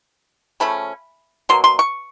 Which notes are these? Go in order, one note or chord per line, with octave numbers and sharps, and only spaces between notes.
C#3 F3 A3 C#4 B5
B2 F#3 A#3 C6
C6
C#6